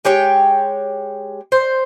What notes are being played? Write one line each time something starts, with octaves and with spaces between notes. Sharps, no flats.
G#3 G4 C#5 G5
C5